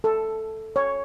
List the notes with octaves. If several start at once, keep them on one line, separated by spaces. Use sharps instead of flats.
A4
C#5